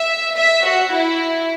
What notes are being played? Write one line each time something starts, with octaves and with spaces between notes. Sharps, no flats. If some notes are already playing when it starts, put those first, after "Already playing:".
Already playing: E5
E5
F#4
E4